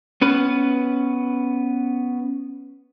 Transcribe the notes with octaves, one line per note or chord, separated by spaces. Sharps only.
B3 C#4 B4